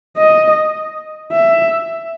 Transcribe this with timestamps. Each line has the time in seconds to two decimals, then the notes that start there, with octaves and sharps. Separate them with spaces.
0.17 D#5
1.32 E5